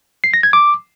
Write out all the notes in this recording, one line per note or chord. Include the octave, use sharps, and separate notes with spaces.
C7
A#6
G#6
D6